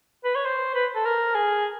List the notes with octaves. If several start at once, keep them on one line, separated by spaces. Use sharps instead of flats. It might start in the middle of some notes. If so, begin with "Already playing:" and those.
B4
C#5
C5
B4
A4
A#4
G#4